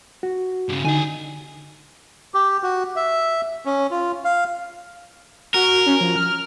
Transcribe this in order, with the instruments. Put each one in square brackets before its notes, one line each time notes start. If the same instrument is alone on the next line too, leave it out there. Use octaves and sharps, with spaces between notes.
[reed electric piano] F#4
[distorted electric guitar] G2 C#3
[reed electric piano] D3 D#4 [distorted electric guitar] G4 G#5
[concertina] G4
F#4
E5
C#4
F4
F5
[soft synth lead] F#4 [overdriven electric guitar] A#4
[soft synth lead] C#4
F3
F6